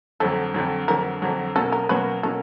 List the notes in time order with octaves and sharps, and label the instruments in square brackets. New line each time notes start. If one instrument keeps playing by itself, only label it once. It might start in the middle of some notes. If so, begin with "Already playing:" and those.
[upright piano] F2 D3 F#3 [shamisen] A4
[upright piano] F2 D3 F#3
[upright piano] F2 D3 F#3 [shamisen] A#4
[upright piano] F2 D3 F#3
[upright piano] B2 F#3 A#3 C#4 F#4 [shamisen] A4
[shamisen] A#4
[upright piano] B2 F#3 A#3 C#4 F#4 [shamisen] B4
[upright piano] B2 F#3 A#3 C#4 F#4 [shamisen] A4